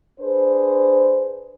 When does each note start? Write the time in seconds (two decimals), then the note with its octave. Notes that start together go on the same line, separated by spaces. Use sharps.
0.20 D4 G#4 B4 C5